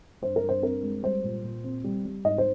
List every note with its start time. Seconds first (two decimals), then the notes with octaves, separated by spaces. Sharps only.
0.22 G2 C5
0.36 A#4
0.43 G2
0.49 C5
0.62 C4 A#4
0.83 G#3
1.03 G3 C5
1.24 A#2
1.44 A#2
1.64 C4
1.84 G3
2.05 G3
2.24 G#2 D#5
2.38 C5